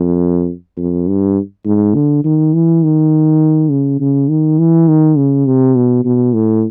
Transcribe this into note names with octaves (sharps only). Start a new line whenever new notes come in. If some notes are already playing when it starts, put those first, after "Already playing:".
Already playing: F2
F2
G2
G#2
D3
D#3
E3
D#3
C#3
C#3
D#3
E3
D#3
C#3
C3
B2
B2
A2